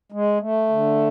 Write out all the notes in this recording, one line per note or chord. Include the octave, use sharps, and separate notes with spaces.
G#3
A3
D3